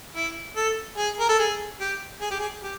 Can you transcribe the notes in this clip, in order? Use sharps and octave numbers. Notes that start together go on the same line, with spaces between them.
E4
A4
G#4
A#4
A4
G#4
G4
G#4
G4
G#4
G4